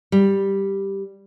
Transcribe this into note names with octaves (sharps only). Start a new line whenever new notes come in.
G3